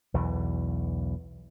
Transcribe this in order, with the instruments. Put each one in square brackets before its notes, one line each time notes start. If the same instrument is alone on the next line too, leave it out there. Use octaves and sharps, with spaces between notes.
[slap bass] B1 E2 E3